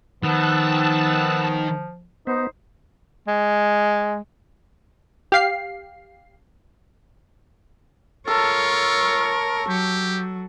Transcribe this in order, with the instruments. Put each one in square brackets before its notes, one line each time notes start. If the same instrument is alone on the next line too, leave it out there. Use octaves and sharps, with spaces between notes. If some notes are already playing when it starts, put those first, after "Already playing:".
[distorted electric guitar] D#3 [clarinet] F3 [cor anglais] B3 [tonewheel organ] A5 E6 F#6
[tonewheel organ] B3 [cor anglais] D#4 [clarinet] C5
[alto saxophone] G#3
[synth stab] G4 F5 C7
[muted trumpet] F4 [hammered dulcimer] A4 [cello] A#4 C#5
[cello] F#3 [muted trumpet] G4